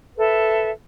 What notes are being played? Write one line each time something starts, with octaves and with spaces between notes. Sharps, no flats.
A4 B4 E5